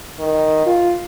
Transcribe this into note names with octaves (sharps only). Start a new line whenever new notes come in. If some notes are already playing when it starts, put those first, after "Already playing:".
D#3
F4